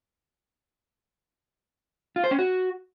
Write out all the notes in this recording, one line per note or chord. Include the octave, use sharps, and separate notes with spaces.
F4
C5
C#4
F#4